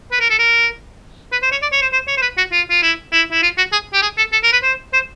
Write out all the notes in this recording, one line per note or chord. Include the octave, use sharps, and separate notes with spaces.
B4
A#4
A4
A#4
B4
C5
C#5
D5
C#5
C5
C5
C#5
C5
B4
F#4
F4
F4
E4
E4
E4
F4
F#4
G#4
G4
G#4
A4
A4
A#4
B4
C5
C5